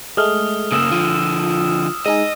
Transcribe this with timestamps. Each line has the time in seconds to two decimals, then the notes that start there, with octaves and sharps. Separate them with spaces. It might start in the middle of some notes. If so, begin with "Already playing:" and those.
0.17 G#3 A3 D#6 F6
0.72 C#3 A#3 D#6 E6 E7
0.91 D3 F3 F4
2.06 G#3 D#4 G#4 D#5